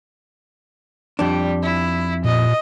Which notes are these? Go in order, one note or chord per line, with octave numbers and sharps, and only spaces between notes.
F2 G3 D4
E4
A#2 D#5